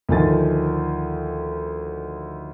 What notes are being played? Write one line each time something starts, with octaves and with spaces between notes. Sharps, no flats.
D2 D#3 F3 G#5 A6